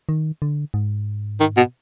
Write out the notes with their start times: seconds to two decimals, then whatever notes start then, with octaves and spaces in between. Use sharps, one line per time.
0.09 D#3
0.42 D3
0.74 G#2
1.40 D#3
1.57 B2